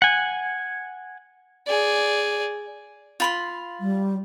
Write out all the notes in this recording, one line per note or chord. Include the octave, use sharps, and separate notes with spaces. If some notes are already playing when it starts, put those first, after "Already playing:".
F#5 G#5
G#4 D5
F4 B5 C6
G3